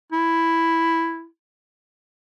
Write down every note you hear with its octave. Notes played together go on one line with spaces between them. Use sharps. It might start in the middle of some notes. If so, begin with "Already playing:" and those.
E4